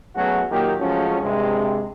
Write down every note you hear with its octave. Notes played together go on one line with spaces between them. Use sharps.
F#3 A3 B3 C#4 F#4 G#4
A#2 D#3 F#3 A#3 G4
F3 F#3 G#3 A3 C#4
G2 C3 G#3